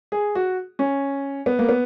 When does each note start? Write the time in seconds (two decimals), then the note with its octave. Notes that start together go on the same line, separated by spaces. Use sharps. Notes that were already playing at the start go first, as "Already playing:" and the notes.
0.12 G#4
0.35 F#4
0.79 C#4
1.46 B3
1.59 A#3
1.69 B3